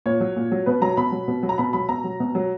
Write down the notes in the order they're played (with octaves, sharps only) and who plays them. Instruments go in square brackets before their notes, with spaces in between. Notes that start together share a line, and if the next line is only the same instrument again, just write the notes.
[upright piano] A#2 C#5
F#3
A#2
F#3
B2 B4
F#3 A#5
B2 B5
F#3
B2
F#3
A#5
B2 B5
F#3 B5
B2 A#5
F#3
B2
F#3